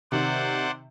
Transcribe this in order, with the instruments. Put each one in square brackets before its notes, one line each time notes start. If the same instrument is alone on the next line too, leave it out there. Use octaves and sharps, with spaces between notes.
[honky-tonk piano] C3 D#3 [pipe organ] C5 D5 F#5